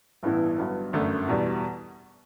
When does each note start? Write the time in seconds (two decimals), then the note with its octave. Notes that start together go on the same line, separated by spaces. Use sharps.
0.23 A1 G2 E3 B3 E4
0.58 G1 G2 F#3 B3
0.93 G1 F#2 D3 A3
1.28 E2 B2 G3